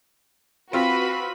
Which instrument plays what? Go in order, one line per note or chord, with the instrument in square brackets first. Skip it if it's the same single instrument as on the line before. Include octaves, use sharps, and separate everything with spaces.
[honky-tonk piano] C4 F4 [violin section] F#4 B4 B5